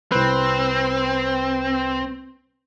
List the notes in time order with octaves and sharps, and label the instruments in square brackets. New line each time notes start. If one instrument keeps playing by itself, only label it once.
[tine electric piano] C2 B4 [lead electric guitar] C4